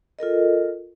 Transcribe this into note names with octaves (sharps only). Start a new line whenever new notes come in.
F4 A4 A#4 D#5